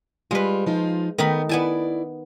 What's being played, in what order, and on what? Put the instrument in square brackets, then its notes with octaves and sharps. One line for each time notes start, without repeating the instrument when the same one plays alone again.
[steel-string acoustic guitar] G3 F4 [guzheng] G#3 B4
[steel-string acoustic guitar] F3 D#4 F4
[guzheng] D#3 D#4 B5 [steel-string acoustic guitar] A3 B3
[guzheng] B3 G#5 A5 [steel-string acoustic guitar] E4 D5